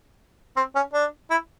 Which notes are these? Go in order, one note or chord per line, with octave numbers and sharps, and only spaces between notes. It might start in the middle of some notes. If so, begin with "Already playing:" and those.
C4
C#4
D4
E4